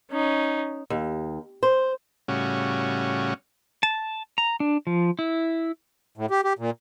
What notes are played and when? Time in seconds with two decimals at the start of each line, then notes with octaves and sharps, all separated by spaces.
0.11 C#4 D#4
0.90 D#2
1.63 C5
2.28 A2 C#3 G3 C#4 F#4
3.83 A5
4.38 A#5
4.60 D4
4.87 F3
5.19 E4
6.17 A2
6.31 G4
6.44 G4
6.59 A#2